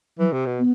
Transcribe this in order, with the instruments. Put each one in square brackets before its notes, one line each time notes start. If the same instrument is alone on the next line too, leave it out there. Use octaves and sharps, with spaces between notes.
[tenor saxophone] E3 [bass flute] F#3
[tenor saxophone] C3
B2
[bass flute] B3